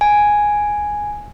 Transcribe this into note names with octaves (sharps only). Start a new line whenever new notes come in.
G#5